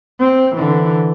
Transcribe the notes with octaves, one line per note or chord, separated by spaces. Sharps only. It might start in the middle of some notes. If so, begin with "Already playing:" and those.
C4
D3 E3